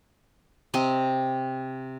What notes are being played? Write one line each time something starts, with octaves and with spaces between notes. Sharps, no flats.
C3 C4 D#5 C6